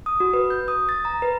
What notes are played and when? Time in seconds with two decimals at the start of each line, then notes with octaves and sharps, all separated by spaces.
0.06 D#6
0.20 F#4
0.33 B4
0.50 G6
0.68 D#6
0.89 A6
1.05 A#5
1.22 B4